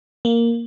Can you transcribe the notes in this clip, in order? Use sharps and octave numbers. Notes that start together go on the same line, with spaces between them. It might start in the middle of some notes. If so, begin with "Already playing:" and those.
A#3